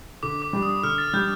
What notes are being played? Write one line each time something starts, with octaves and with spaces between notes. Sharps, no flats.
D3 D6
D6
G3 D4
D#6
D3 F6
A6
G3 D4 G6